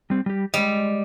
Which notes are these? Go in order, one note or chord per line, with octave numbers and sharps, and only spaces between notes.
G3 C4
G3 G4
G3 G#3 D#5